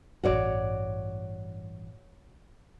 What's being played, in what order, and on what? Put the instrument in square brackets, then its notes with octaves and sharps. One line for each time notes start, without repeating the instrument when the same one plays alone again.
[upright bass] A1 G2 [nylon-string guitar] F#4 C#5 D5